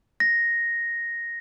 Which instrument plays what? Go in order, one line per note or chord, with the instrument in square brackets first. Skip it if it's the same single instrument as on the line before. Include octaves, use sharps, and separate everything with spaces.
[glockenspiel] A#6